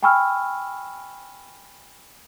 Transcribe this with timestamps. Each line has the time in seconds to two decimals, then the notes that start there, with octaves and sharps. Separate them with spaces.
0.03 G5 G#5 B5 C#6 E6 F6